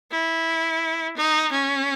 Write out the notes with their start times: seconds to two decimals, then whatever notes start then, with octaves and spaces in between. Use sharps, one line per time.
0.12 E4
1.17 D#4
1.52 C#4